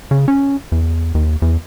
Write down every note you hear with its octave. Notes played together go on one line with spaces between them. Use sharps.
C#3
C#4
E2
D#2
E2